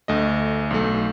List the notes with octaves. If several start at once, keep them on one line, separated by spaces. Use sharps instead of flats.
D2 A3 D#5
B1 A3